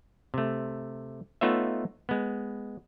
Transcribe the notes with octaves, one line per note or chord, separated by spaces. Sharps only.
C3 A3
A3 B3 D#4 F4 C#5 E5
G#3 B3